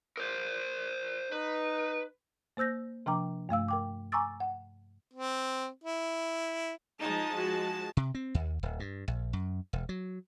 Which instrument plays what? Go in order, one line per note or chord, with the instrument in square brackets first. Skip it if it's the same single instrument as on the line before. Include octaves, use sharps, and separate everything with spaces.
[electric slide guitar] A#4 C5
[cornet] D#4 [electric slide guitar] B4
[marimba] A#3 C5 E6 G6 A#6
C3 F3 D4 G5 A#5 D6
G2 A3 F5 E6
A#4 G5 D6
G#5 A#5 C#6 D6 E6 A6
F#5
[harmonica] C4
E4
[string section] F3 G#3 A5 [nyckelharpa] D#4
[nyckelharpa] F#4
[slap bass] C3
C4
D#2
D1
G2
A#1
F#2
E1
F#3